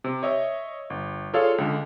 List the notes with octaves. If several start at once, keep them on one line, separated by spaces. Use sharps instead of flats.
C3
C#5 D#5 E5
G1
F4 G#4 A4 C#5 D5 F5
C#2 D3